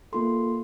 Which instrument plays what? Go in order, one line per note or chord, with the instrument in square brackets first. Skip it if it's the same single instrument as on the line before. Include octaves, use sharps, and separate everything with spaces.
[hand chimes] A#3 F4 A4 C6